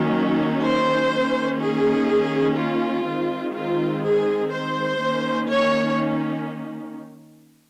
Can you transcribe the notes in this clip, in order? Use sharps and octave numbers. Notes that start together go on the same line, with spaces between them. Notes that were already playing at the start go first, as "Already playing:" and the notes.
Already playing: D#3 F#3 A#3 C#4
C5
D#3 A#3 C#4
G#4
F4
D#3 G#3 C4
F4
G#4
C5
D#3 A#3 C#4
C#5